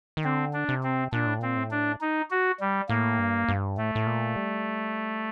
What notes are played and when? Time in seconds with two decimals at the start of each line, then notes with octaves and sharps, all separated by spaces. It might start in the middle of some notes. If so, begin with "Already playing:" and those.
0.17 D#3
0.24 D3 C4
0.54 D4
0.69 C3
0.83 C4
1.13 A#2 D4
1.27 A2
1.39 A#2 C4
1.57 A2
1.71 D4
2.01 D#4
2.30 F#4
2.60 G3
2.89 A2 A#3
3.19 G2
3.49 G2
3.78 A2 A3
3.95 A2
4.07 A#2
4.36 G3